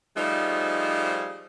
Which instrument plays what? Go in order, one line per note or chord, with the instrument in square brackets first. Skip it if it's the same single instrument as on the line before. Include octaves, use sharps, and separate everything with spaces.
[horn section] F3 G3 A3 D#4 G#4 C5